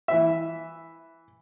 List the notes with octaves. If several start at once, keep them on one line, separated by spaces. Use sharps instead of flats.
E3 E5